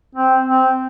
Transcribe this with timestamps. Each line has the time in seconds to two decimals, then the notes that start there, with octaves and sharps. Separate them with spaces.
0.15 C4
0.46 C4